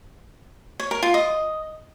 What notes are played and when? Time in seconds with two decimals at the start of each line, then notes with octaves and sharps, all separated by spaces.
0.80 C#5
0.91 A#4
1.03 F4
1.14 D#5